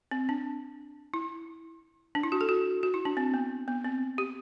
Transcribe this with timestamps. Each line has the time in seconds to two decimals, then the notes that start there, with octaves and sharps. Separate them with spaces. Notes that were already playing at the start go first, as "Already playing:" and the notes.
0.11 C4
0.29 D4
1.14 E4
2.15 D4
2.23 E4
2.32 F#4
2.41 A4
2.49 F#4
2.83 F#4
2.94 E4
3.05 D4
3.17 C4
3.34 B3
3.68 B3
3.85 C4
4.18 G4